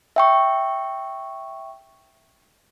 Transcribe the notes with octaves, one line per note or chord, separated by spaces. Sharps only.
E5 G5 C#6